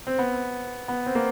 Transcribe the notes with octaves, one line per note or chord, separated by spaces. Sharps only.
C4
B3
B3
C4
A#3